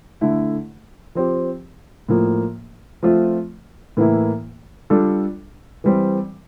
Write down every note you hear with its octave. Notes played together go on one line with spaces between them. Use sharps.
D3 A3 E4
F3 C4 G4
A2 F3 A#3
F3 A3 C4 F4
A2 E3 A#3 E4
G3 D4 F4 A4
E3 G3 C4